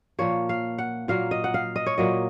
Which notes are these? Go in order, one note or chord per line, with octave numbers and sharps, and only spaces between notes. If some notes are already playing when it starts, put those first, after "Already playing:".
A#2 F3 A#3 C#5
F5
F#5
A#2 F#3 A#3 F5
D#5
F#5
F5
D#5
C#5
A#2 F#3 A#3 D#5